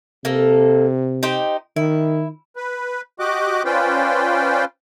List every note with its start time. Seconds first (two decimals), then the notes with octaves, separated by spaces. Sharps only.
0.25 C3 A#3 A4
1.23 D#4 G4 C5
1.76 D#3 E4
2.56 B4
3.20 F#4 G4 D#5 D6 F#6
3.65 C#4 F4 B4 C5 D5 G5